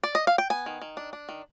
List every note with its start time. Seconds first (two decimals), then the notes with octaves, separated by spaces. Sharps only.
0.03 D5
0.15 D#5
0.27 F5
0.38 G5
0.50 B3 G#5
0.66 D#3
0.81 D#3
0.97 D4
1.13 D4
1.29 D#3